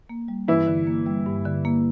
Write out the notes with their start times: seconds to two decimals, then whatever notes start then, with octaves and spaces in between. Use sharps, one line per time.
0.09 A#3
0.28 G3
0.48 G2 E3 E4
0.67 D3
0.87 A#3
1.06 G3
1.26 G2
1.46 D3
1.65 A#3